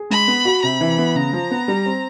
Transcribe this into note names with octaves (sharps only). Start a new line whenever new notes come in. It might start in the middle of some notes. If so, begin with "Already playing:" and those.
Already playing: G#4
G#3 B5
B3
F#4
C3 B5
E3
B3
C#3 A#5
F3
B3
G3
C4